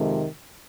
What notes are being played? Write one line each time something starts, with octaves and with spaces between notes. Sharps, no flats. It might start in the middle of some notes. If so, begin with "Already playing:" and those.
Already playing: F2 C3 D#3 G#3